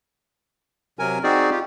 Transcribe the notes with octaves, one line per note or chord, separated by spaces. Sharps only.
C3 F#3 A#4 G#5
C4 D#4 F#4 G#4 D5
F4 G4